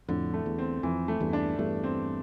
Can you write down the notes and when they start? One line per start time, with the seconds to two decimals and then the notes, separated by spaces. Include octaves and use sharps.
0.08 F2 A2 D3
0.34 A3
0.46 E2
0.59 C4
0.83 F2 E3
1.08 A3
1.21 E2 G2
1.33 D4
1.59 E2 G2 A3
1.84 C4